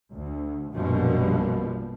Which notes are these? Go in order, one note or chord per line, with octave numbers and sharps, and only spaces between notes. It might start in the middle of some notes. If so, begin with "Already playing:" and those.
D2
A#1 F#2 B2 F3 G3